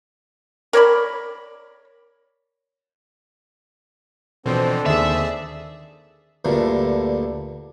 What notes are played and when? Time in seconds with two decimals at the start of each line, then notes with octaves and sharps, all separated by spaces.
0.73 A#4 C#5 D5 B5
4.46 B2 E3 F3 C4 D4 A4 C5
4.86 D#2 G#4 D5 E5
6.45 D2 G2 A#2 D3